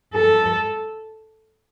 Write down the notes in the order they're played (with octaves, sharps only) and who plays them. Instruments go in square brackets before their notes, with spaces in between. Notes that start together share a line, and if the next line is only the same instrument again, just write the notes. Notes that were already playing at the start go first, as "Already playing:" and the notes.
[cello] A4